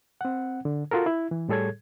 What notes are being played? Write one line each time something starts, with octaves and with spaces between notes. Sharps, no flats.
C4 F#5
D3
F4 F#4 A4 A#4
E4
E3
A2 G3 G#4 A4 C#5 G#6